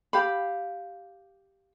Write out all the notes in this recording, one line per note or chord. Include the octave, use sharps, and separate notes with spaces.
G4 F5 B5